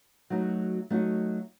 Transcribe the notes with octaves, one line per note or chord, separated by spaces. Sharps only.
F#3 A3 D#4 F#4
F#3 A3 D#4 F#4